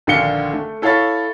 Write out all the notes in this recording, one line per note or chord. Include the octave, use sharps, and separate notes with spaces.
A#1 D3 D#3 F5 C#7 G7
A3
E4 A4 C#5 F5 B5 A6